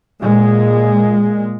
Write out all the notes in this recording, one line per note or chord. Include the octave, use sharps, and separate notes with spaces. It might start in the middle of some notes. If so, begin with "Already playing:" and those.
A#2 G#3